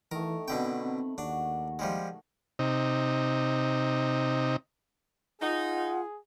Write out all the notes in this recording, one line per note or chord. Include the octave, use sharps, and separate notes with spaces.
D#3 E3 A3 A#4
B2 D3 C4 G5 B5
C4
D#2 D4 F#4
F3 G3 G#3
C3 D#4
D#4 F4 G#4 F#5